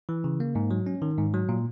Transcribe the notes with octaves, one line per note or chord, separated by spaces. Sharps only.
E3
C#3
A#3
G#2
F#3
C#4
D#3
G#2
F#3
A#2